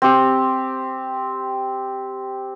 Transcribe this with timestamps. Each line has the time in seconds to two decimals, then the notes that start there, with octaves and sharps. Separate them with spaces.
0.02 C4 G4